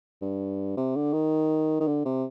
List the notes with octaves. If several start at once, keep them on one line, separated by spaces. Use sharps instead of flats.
G2
C3
D3
D#3
D#3
D3
C3